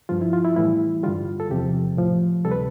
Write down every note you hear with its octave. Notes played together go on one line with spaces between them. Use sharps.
G2 F3 F4
E4
F4
E4
A2 E3 G3 E4
G2 D3 G3 F4
A4
E2 C3 F3 G4
A2 F3
D2 C3 G3 A4
B4